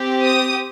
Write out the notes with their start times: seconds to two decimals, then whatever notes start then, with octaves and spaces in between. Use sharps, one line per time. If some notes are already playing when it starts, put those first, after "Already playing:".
Already playing: C4 G4
0.23 D#6